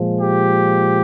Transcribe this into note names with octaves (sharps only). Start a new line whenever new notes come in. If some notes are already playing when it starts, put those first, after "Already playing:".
Already playing: A#2 F3 G#3
G4